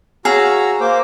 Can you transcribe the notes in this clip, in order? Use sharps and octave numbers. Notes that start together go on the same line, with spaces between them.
F#4 G#4 C#5 F5 A#5 E6
A#3 C5 D6